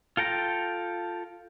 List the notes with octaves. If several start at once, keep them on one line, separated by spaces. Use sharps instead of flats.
F4 A4 G5 A#5